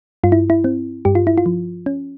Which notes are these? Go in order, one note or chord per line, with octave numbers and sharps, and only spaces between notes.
G2 F4
E4
E4
C4
G2 G4
F4
E4
F4
F3
C#4